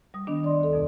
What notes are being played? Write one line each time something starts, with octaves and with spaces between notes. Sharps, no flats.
G3 D#6
D#3 B3 D4
D5 C6
D2 A4
F2 B2